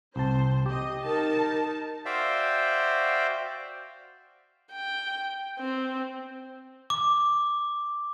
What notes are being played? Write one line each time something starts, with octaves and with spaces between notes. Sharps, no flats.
C2 C5 A5
G4 D#5
D#4 A#4 A5
F#4 C5 D5 E5 F5 G5
G5
C4
D6